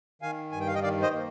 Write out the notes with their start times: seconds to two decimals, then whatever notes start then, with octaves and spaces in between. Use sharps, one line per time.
0.22 D#3 F5 G#5
0.51 G2 G#5
0.60 G5
0.67 F5
0.74 D#5 G5
0.82 D#3 D5 F5
1.02 C5 D#5
1.13 A#3